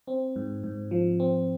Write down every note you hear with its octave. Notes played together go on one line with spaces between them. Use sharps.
C4
G#2
G#2
F3
C4